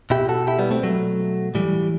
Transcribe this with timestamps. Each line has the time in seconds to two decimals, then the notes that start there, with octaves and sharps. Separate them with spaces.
0.10 B2 E4 G4
0.29 F#4 A4
0.47 E4 G4
0.59 G3 B3
0.71 A3 C4
0.83 B2 F#3 A3
1.55 A2 E3 G3